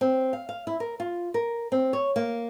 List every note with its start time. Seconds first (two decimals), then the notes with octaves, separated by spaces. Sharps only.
0.01 C4
0.33 F5
0.49 F5
0.67 E4
0.80 A#4
1.00 F4
1.34 A#4
1.72 C4
1.93 C#5
2.16 A#3